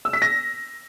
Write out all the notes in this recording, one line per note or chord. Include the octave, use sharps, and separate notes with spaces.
E6
B6
A#6